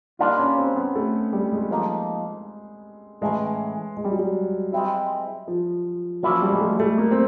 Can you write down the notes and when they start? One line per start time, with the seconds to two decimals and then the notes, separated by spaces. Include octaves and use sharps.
0.19 G3 A#3 D4 D#4 F4
0.39 C#4
0.58 C4
0.76 B3
0.95 A3
1.33 G3
1.52 G#3
1.71 F3 A#3 D#4
3.21 A2 E3 G#3 A3 C#4
3.97 G#3
4.04 G3
4.12 F#3
4.19 G3
4.72 G#3 C4 E4
5.48 F3
6.23 F3 F#3 A#3 C#4 E4
6.42 G3
6.52 G#3
6.61 A3
6.80 A3
6.98 A#3
7.11 C4